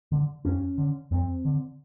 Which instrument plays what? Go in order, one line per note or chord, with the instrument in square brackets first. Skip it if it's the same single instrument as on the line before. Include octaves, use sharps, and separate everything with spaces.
[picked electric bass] D3
F2 C#4
D3
F2 C4
D3